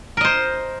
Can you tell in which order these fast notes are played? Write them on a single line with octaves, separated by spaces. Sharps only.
A#4 D#5 C5